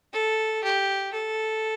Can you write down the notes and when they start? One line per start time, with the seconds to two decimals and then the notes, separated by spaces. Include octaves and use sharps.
0.13 A4
0.63 G4
1.13 A4